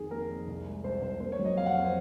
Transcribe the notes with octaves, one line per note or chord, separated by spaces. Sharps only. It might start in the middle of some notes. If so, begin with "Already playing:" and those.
Already playing: F2 D#3 G#4
A#3 A#4
F2
C2
G#3
C2 C5
C2 C5
A#3 C5
C#5
F#3
D#5
F2 F5
F#5
F2 F5
C5